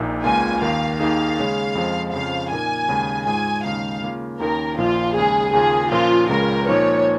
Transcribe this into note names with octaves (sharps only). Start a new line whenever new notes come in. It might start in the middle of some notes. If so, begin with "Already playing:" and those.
Already playing: A#1 A#2 A#3 D#4
C#2 C#3 A#3 F4 G#5
D#2 D#3 A#3 F5
D#2 D#3 A#3 D#4 G#4 F5
C#3 G#3 C#4 G#4
F2 F3 G#3
F2 C#3 F3 F5
A#2 A#3 D#4 A#4 G#5
D#2 C#3 G#3 D#4 G#4
G#2 G#3 F4 G#4 G#5
D#2 C#3 G#3 D#4 F5
C#3 A#3 F4
D#2 D#3 A#3 C#4 A#4
A#1 A#2 F3 A#3 F4
D#2 C#3 G#3 G#4
D#2 C#3 A#3 F4 G#4
A#2 F3 C#4 F4 A#4
C#2 C#3 G#3 F4 A#4
A#2 F3 A#3 D#4 A#4 C#5